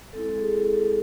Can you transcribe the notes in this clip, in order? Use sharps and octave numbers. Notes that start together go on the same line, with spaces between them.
G#3 C4 E4 A4
A4
G#4
A4